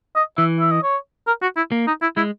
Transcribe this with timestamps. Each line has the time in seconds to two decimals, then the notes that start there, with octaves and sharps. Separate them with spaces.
0.16 D#5
0.38 E3 E5
0.60 E5
0.71 D#5
0.83 C#5
1.27 A#4
1.42 F#4
1.57 E4
1.72 A#3
1.87 D#4
2.02 E4
2.17 G#3 E4